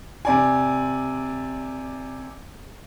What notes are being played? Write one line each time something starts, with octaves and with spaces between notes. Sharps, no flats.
C3 D5 G#5